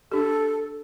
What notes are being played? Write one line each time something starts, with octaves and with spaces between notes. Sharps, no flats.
D4 G4 A4